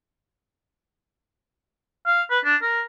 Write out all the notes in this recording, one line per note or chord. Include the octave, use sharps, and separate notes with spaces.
F5
B4
D4
A#4